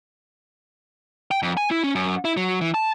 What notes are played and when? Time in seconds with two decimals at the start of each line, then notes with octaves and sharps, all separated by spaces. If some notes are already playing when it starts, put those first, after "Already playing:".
1.31 G5
1.43 F2
1.57 G#5
1.71 E4
1.83 C#4
1.95 F#2
2.25 E4
2.37 F#3
2.61 E3
2.74 A5